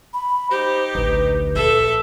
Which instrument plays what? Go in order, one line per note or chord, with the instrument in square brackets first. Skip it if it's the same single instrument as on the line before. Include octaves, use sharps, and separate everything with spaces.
[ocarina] B5
[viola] D#4 G4 [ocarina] C5
[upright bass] A1 D2 [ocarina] B4
[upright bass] A#1 [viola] A4 E5